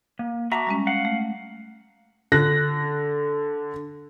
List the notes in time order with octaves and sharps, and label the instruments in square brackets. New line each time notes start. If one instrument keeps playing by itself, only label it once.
[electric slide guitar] A#3
[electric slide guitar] F#4 E5 A#5 [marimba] F#5 A5 D6
[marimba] G3 G#3 C#4
[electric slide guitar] F5 F#5
[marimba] A3
[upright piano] D3 F#6 A#6